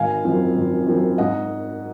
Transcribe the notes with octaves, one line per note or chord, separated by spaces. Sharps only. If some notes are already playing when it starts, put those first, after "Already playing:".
Already playing: G#1 F5 G#5
F#2 F3 C4
G#1
F#2 F3 C4
G#2 D#5 F#5